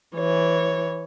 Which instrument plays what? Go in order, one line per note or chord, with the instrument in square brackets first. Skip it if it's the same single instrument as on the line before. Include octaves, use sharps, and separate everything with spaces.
[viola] E3 C#5